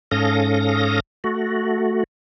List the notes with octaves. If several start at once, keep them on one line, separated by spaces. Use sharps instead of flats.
G#2 C#4 A4 F5 D#6 A#6
A3 F#4